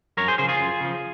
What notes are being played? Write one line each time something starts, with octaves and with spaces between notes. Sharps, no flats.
F#2 A#4 C#5
G#4 C5
C#3 F3 G#4 C5
F4 G#4
F#2
C#3 F3